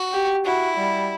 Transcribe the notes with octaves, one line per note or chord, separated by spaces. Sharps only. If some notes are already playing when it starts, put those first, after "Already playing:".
Already playing: F#4
G4
E4 F#4
G3